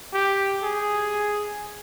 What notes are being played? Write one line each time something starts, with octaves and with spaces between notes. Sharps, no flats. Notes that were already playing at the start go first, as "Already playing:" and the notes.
G4
G#4